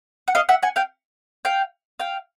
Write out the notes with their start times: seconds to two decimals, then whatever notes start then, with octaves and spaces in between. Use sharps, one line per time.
0.28 F#5
0.35 D#5 F5
0.49 E5 F#5
0.63 F#5 G#5
0.76 F5 G5
1.45 F5 G5
2.00 F5 G5